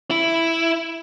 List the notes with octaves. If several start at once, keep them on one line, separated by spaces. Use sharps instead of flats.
E4